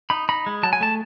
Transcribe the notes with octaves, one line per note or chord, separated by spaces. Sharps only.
D#4 B5
D#4 B5
G#3
F#3 A5
G#5
A3 A5